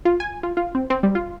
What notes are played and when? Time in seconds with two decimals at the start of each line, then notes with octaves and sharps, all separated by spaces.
0.05 F4
0.20 G#5
0.43 F4
0.57 F4
0.75 C4
0.90 C4
1.03 G3
1.15 F4